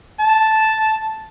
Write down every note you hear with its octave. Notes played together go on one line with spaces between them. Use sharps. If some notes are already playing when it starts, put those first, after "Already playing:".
A5